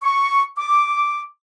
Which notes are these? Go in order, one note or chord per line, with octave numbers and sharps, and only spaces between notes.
C#6
D6